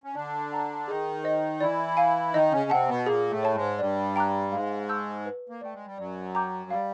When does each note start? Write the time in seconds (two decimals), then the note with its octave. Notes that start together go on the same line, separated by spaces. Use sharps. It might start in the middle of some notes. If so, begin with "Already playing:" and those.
0.04 C#4
0.15 D3 D4 D5
0.52 F#5 A#5
0.88 D#3 D#4 G#4
1.24 C5 D#5
1.60 E3 E4 D5
1.97 F5 G#5
2.34 D#3 D#4 D#5
2.52 C#3 C#4
2.70 C3 C4 F#5 A5
2.88 B2 B3
3.06 A#2 A#3 G#4
3.30 A2 A3
3.43 C#5 E5 A5
3.55 G#2 G#3
3.79 G2 G3 D5
4.16 G5 A#5 D6 F#6
4.52 G#2 G#3 F5
4.88 A5 C#6 E6 G6
5.26 B4
5.49 A#3
5.61 A3 D5 G5
5.74 G#3
5.86 G3
5.98 F#2 F#3 D5
6.35 G5 A#5 D6 G6
6.70 G3 F5